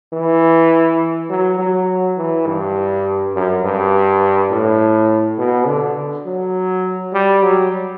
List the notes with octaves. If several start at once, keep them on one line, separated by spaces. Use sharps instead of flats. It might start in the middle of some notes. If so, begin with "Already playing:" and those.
E3
F#3
F#3
E3
G2
F#2
G2
A2
B2
D3
F#3
G3
F#3